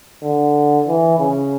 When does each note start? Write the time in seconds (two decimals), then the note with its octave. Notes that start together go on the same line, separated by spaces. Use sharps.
0.23 D3
0.88 E3
1.19 C#3